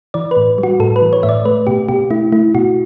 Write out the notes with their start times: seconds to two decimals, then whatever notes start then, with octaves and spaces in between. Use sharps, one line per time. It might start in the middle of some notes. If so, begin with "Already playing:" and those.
0.14 E3 D5
0.31 B4
0.37 A2
0.58 G3
0.63 F#4
0.80 A2 A4
0.96 B4
1.02 E3
1.13 C#5
1.23 A2 E5
1.29 D5
1.45 A3 B4
1.67 B2 G4
1.88 B2 G4
2.10 A3 E4
2.32 A3 E4
2.55 B2 F#4